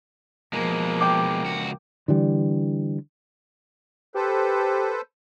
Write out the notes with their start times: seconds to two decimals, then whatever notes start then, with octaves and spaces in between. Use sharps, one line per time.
0.53 B2 F3 G#3 A#3
1.01 G5 D6
1.44 C#2 F#4
2.08 D3 E3 G3
4.15 G4 A4 B4 C5